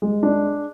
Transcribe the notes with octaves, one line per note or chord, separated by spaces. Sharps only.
G#3
D4